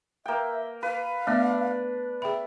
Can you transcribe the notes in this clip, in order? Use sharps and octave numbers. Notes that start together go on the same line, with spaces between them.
A#3 E5 G5
B4 F5
A3 B3 D4 E5
G#4 E5 G5 B5